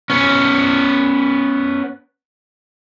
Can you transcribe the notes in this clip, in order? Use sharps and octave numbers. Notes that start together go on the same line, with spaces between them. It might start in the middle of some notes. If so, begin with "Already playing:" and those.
B3 C#4